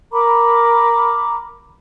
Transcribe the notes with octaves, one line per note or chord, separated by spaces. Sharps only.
A#4 A#5 B5 D6